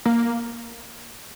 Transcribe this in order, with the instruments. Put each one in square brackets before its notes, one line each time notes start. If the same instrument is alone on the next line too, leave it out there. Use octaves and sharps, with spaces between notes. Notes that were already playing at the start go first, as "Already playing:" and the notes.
[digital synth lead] A#3